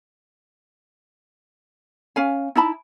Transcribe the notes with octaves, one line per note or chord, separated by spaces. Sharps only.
C#4 F5 G#5
D#4 E4 A5 B5